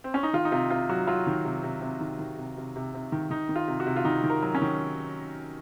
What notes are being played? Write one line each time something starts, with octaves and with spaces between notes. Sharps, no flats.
C4
C#4
D#4
D#3 F4
D#4
C3 F4
C3 F4
F#3 F#4
F#3 F4
D#3
C3
C3
C3
D#3
D#3
C3
C3
C3
C3
D#3
D#3 D#4
D#3
F4
C3
F#4
C3
F4
D#3 D#4
D#3
A#4
F#3
C#4
D#3